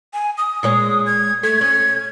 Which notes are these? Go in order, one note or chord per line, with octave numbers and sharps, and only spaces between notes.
G#5
D#6
A#2 G#3 C#5 D#6
G#6
A3 G#6
C#4